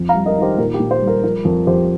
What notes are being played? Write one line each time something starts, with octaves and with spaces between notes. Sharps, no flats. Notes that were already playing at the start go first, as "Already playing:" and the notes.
Already playing: F2
F5 A#5
G3
A#4 D#5
D#3
G4 C5
A#2 A#4
G4
A#2
G4 C5
G3
A#4
F3 A#4
F2 A#4
F2 G4 C5